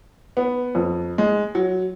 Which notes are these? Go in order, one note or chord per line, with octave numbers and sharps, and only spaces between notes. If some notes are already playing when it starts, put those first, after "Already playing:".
B3
F2
G#3
F#3